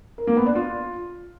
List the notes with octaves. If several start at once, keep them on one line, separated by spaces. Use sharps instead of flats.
A#4
A#3
B3
D4
F4